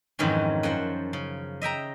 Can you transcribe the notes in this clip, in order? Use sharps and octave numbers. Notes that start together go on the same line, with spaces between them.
F2 G#2 D#3 E3 F#3 C#4
F#2 F3 F#5
C#3
D#5 E5 G5 A#5